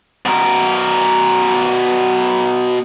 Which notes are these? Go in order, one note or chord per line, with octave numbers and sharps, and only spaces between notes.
B2 A#4